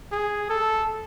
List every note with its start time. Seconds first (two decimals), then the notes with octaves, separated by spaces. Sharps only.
0.12 G#4
0.50 A4